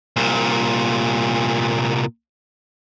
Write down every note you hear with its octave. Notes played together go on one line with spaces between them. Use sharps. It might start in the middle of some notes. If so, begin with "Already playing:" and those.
C2 A#2